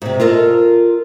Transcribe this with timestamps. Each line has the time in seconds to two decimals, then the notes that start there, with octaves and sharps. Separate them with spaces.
0.02 G#2 C3
0.20 F4 A4 A#4 D#5